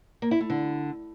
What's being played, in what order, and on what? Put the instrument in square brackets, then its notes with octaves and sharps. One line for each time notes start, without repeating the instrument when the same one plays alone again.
[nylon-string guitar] A#3
E4
A3
D3